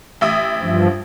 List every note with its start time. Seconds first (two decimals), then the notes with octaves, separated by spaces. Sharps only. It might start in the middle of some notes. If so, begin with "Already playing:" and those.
0.21 A1 E5 D#6
0.61 G2 F3